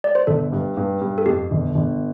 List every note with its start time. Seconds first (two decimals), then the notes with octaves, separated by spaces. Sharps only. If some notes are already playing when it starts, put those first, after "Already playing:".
0.04 D5
0.15 C5
0.27 G1 A4
0.52 G2
0.77 G2
1.01 G2
1.18 A4
1.26 F2 G4
1.51 G1
1.75 G1